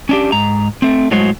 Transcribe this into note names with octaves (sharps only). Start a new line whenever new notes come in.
C#4 D4 G4
G#2 A#5
A3 C4
A2 F#3 G#3 F#4 C5